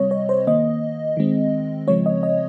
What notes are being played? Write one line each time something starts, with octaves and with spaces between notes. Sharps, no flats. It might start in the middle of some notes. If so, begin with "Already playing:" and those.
Already playing: C3 G3 C4 C#5 D#5
C#5
C5
D#3 A#3 D#5
D#3 G#3 C4
C#3 F3 G#3 C4 C#5
D#5
D#5